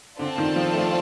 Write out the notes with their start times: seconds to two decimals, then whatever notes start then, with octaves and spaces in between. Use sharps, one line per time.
0.19 D3 C4 F4 A4 D5 A5
0.38 D#3
0.56 F3
0.74 A3